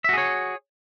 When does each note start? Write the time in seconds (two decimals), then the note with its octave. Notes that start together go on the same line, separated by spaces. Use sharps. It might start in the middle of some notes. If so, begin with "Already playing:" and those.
0.04 E5
0.09 F#4
0.13 G#4
0.18 C#5